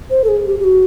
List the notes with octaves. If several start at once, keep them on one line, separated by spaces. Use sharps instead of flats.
C5
A4
G#4
G4
G4
F#4